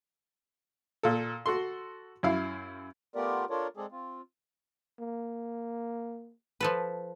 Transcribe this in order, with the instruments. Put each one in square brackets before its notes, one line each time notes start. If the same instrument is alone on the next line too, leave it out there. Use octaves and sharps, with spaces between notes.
[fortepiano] A#2 A4
F#4 A4 C6
F#2 E4 F5
[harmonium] A3 B3 F4 G4 A#4 D5
D4 F4 A4 A#4 C#5 D5
G#3 C4 G#4 A4 D5
C4 F4
[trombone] A#3
[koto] F3 A4 B4